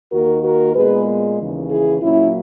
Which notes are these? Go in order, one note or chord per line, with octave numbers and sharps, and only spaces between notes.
D#2 D#3 A#3 F#4 A#4
F#4 A#4
A#2 G#3 B3 G#4 B4
D#2 C#3 E3
E4 G#4
A#2 F#3 A#3 C#4 E4